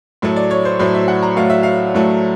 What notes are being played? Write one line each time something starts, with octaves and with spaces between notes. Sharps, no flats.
A2 F#3 A3
D5
C#5
C5
A2 F#3 A3 C5
E5
F#5
A#5
A2 F#3 A3 F5
E5
F5
A2 F#3 A3